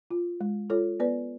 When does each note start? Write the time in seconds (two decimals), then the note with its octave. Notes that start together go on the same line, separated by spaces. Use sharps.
0.11 F4
0.41 G#3
0.70 F4 A4 C#5
1.00 B3 B4 D5